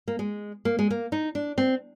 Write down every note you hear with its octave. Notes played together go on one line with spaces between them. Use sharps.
A#3
G#3
A#3
G#3
A#3
D#4
D4
C4